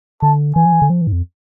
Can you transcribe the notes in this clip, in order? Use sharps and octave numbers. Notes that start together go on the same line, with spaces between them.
D3 A5
E3 G#5
F3
E3
D3
F3
E3
G#2
F2